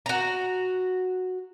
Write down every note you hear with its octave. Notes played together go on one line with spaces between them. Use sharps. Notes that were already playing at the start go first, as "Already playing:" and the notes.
F#4 A#5